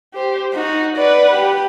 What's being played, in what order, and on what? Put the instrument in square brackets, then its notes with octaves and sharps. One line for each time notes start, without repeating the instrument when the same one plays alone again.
[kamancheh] G4 C5
[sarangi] D#4 [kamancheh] F#4
[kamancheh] B4 F#5 [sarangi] D5
[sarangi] G4